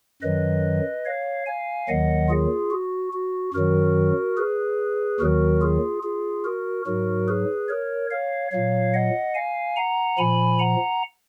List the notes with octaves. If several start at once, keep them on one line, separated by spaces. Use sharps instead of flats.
F#2 D#3 F#3 B4 D#5
C#5 F5
F5 G#5
D#2 D#3 F#3 D#5 F#5
F4 G#4
F#4
F#4
F#2 D#3 F#3 F#4 A#4
G#4 B4
D#2 D#3 F#3 F#4 A#4
F4 G#4
F4 G#4
F#4 A#4
G#2 F#3 F#4 A#4
G#4 B4
A#4 C#5
C#5 F5
A#2 F#3 C#5 F5
D#5 F#5
F5 G#5
F#5 A#5
A#2 F3 G#5 B5
F#5 A#5